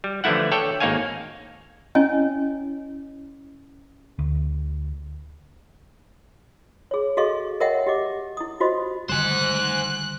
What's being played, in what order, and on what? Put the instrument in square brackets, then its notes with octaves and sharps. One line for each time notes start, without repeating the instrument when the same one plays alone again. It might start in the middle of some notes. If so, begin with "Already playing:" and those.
[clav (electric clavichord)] G3
D3 E3 F3 A3 E4 F#5
A4 C#5 D5 G5
G#1 A#3 D#4 C#5 F5 G#5
[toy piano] C#4 E4 C#5 D#5 G#5
[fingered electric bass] D2
[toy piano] G#4 C#5
F#4 G#4 A4 D#5 F5 C#6
A#4 C#5 D#5 E5 F#5 G5
G4 D#5 D6
E4 D#6
F4 F#4 C5 D#5
[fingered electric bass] D3 D#3 G3 [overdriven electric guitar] C5 G#5 [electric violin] F#6